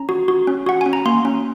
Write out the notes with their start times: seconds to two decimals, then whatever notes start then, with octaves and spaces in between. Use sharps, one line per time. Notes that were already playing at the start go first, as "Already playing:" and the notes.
Already playing: C#4 A#5
0.09 F#4
0.28 F#4
0.47 C#4
0.66 F#4 F#5
0.81 C#4 G#5
0.93 A#5
1.05 A#3 C6
1.25 C#4